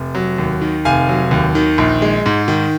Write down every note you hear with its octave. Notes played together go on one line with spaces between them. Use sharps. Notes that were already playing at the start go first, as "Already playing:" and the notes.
Already playing: F1
F#3
D#2
D#3
F1 F5 G#5
F#3
D#2
D#3
A#1
G#3
G#2
D#3